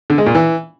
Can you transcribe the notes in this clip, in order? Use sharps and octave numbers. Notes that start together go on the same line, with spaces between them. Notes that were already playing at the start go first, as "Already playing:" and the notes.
D3
G#3
A#2
E3